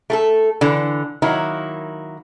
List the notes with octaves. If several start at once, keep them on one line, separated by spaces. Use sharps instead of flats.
A3 G#4 A4
D3 E3
D#3 F#3 A#3 E4